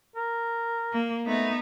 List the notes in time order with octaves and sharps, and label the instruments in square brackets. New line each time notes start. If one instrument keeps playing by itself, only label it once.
[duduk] A#4
[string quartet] A#3
[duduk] A3 [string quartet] B3 D#4